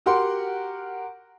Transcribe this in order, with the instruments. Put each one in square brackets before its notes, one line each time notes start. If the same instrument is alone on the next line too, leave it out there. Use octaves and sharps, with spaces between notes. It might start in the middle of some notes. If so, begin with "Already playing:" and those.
[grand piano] F#4 G4 A#4 F#5 C6